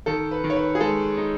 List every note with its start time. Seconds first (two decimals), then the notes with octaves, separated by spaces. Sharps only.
0.06 D#3 A4
0.31 B4
0.44 D#3
0.50 C#5
0.56 B4
0.75 G#4
0.80 G#3 A4
1.18 D#4